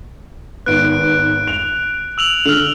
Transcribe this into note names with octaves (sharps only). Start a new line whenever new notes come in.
G#1 B3 F#6 D7
F7
E6 F7 F#7
D3 F6 F7